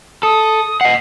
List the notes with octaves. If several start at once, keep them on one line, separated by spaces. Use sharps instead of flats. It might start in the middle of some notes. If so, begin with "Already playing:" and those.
A4 D#6
D#5 F#5 C7